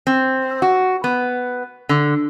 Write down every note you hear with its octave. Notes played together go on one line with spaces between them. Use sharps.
C4
F#4
B3
D3